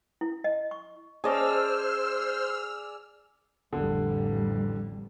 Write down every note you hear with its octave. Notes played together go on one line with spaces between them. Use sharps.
E4
D#5
C#6
C#4 G#4 C5 D5 D#5 A5 E6 F6
A1 F2 D3 G3